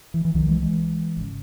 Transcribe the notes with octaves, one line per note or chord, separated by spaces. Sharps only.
E3
E3
C2 C3 D#3 F#3
E3 G#3
E3 G#3
G#1 C#3